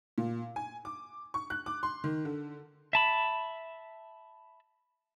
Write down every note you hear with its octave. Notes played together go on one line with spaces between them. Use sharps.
A#2
G#5
D6
C#6
F#6
D6
C6
D#3
D3
E5 A5 B5